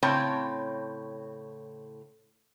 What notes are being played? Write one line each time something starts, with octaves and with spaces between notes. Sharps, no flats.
A2 C#3 C4 C#5 G5 A5